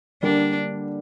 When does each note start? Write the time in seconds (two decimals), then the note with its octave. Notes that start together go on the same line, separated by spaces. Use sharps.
0.22 D3 G3 A#3 D4